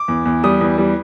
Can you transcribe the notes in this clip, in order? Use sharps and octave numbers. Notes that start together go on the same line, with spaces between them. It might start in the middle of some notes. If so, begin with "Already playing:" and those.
Already playing: D6
E2
E2
G3 D#6
E2
G3